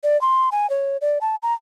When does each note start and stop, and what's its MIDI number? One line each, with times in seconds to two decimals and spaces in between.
0.03 0.19 74
0.21 0.49 84
0.52 0.69 80
0.70 0.97 73
1.01 1.18 74
1.21 1.35 81
1.42 1.53 82